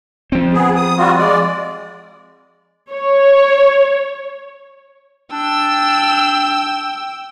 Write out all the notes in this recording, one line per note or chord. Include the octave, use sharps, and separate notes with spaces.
F3 C4
B3 G#4
D#6
G3 F4 F#4
G#3 D5
C#5
D4 G5 E6